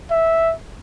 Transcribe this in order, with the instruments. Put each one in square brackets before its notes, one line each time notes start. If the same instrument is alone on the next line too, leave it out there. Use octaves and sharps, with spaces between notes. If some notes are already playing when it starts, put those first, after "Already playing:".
[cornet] E5